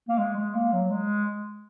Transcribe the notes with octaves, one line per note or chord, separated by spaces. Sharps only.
A#3
G#3
G#3
A#3
F#3
G#3